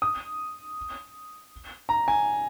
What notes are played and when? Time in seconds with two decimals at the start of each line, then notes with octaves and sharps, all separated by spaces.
0.02 D#6
1.89 A#5
2.08 G#5